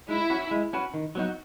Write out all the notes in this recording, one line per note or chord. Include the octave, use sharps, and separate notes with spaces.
G#3 E4
C#4 F#4 B4
G#3
C#4 F#4 B4
D#3
F#3 B3 D#4 F#4